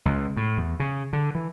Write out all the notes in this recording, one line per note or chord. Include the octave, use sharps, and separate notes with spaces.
C#2
A2
E2
C#3
D3
E3